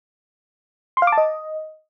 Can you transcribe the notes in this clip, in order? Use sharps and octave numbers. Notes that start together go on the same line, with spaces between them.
C6
F5
D6
A5
D#5